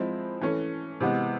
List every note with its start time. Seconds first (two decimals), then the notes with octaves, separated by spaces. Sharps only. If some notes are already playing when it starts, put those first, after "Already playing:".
Already playing: F3 G#3 C4 E4
0.41 E3 A3 C#4
1.00 C3 E3 G#3 B3